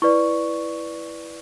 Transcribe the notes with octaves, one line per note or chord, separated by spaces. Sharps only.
E4 B4 D5 C#6